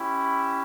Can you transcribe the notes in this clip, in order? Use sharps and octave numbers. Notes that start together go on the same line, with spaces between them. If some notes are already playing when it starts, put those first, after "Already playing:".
Already playing: C#4 E4 G4